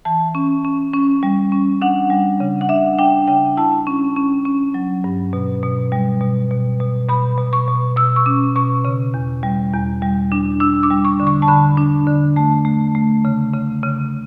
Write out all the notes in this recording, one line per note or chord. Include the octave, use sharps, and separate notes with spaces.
E3 A5
C#4
C#4
C#4
G3
C#4
D4 F#5
G3
C#3
F#5
D4 E5
D4 G5
C#3 G5
E4 A5
C#4
C#4
C#4
F#3
G2
B2
B2
G3
B2
B2
B2
B2 B5
B2
C#6
B2
B2 E6
C#6
C#4 D6
B2 C#6
C#3
E2
G3
E2
G3
D4
D4 E6
D6
G3
C#6
D3
C#6
A5
D3 B5
D4
D3
A3 A5
A3
A3
C#3
C#3
C#3